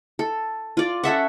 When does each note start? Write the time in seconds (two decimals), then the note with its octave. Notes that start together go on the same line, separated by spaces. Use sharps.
0.19 A4
0.77 F4 D5
1.03 C#4 A4 E5 F#5